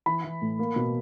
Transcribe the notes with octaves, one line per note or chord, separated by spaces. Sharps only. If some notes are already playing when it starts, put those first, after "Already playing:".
E3 B5
E3
A2
A#3
B2